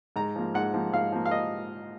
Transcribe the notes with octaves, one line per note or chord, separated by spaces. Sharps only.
G#2 A#5
F3 A#3
G#2 F#5
F3 A#3
G#2 F5
F3 A#3
F5
D#5